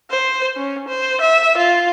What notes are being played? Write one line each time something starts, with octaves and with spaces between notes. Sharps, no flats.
C5
C#4
C5
E5
F4